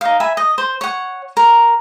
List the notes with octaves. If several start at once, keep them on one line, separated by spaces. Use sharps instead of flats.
D#4 F5
E5 G#5 B5
D#5
C5
C#5 F#5
A#4